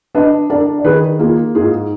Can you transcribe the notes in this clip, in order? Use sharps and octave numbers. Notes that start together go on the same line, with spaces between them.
D4 B4 D#5
D4 A#4 D5
D5
D#3 G#4 B4
A#3 F4 G#4
G#2 F4 G#4